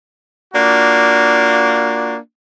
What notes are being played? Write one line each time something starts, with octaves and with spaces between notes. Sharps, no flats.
A#3 D4 F4 F#4